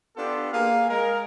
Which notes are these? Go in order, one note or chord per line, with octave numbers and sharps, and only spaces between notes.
B3 D4 F4 G4 A4
A#3 G#4 F5
G#3 A#4